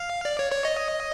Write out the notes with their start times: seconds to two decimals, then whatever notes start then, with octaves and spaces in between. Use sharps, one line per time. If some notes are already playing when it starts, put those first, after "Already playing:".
Already playing: F5
0.25 D5
0.39 C#5
0.52 C#5
0.65 D#5